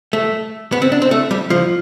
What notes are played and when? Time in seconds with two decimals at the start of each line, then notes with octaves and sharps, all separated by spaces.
0.13 A3
0.72 B3
0.82 C4
0.92 D4
1.02 C4
1.11 A3
1.31 G3
1.50 F3